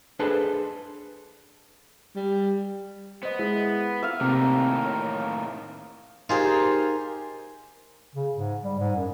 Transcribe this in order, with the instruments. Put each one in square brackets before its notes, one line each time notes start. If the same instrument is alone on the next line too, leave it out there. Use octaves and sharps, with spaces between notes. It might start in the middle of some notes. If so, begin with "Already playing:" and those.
[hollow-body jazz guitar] D4 G#4 A4 B4 C5
[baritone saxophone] G3
[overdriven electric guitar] B3 [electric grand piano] C5 D#5
[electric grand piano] G#3 E4
[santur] E5 F5
[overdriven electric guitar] A2 D#3 [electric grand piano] C3 [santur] A#3
[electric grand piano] C#5 A#5
[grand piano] D#4 G4 [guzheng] F4 G#4 C5 [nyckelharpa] A#4
[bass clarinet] C#3
G#2
G3
G#2
F#2